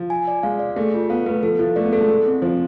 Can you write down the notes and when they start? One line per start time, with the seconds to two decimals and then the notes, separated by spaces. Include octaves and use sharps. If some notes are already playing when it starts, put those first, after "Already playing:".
Already playing: F3
0.10 G#5
0.28 D5
0.43 G#3 F5
0.60 D5
0.76 A3 G#4
0.94 F4
1.10 B3 F5
1.26 A3 B4
1.43 F3 A4
1.59 F3 E4
1.76 A3 D5
1.84 B3
1.93 A3 A4
2.01 G#3
2.09 E4
2.26 C4
2.42 F3 C5